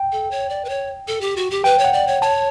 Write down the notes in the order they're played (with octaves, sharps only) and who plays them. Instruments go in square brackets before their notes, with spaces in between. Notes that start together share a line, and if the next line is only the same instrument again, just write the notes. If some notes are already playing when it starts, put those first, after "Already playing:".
Already playing: [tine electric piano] G5
[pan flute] A4
C#5
D5
B4
C#5
A4
G4
F#4
G4
[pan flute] B4 [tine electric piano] G5
[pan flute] C#5
[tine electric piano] F#5
[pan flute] D5
C#5
[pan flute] C#5 [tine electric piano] A5